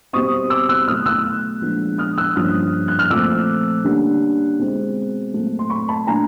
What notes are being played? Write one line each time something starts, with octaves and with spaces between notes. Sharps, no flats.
B2 G3 C4 C#6 D#6
D6 E6
E6 F#6
B2 F#3 A3 D#6 F6
E6 F#6
A#2 F3 G#3 B3 D4
D#6 F6
E6 F#6
G2 D3 F3 A#3 C#4 D#6 F6
F#6
F6
A#2 F3 A3 C4 D6 E6
D3 G3 A#3 C#4
B2 G#3 C4
A#2 F#3 A3 C4
C6
B5 C#6
A5 B5
A#2 F#3 A3 D4 G#5 A#5